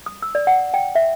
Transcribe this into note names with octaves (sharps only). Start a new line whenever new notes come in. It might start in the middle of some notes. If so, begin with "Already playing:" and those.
D#6
E6
D5
F#5
G5
E5